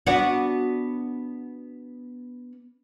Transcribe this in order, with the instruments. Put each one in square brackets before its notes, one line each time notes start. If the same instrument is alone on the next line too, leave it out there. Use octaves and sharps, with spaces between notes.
[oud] B3 D4 F#4